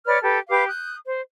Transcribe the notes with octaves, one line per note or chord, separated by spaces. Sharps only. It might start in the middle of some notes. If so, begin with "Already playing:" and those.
B4 C#5 D5 F6
G4 A4 B4
G4 B4 F5 D6
D#6 F#6 G6
C5